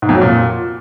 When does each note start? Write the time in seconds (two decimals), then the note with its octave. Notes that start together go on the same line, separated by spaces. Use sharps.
0.02 G#2
0.09 F2
0.15 F#3
0.21 A#2